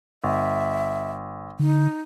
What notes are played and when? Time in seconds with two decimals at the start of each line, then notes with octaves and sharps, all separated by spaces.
0.24 G1 E5
1.59 D3 D#4